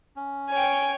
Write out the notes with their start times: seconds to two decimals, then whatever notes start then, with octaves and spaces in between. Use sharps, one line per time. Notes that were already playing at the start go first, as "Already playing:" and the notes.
0.16 C#4
0.50 C#5 G5 G#5